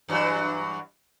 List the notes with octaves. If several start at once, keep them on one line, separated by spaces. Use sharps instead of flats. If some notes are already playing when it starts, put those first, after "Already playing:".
G2 E3 F#3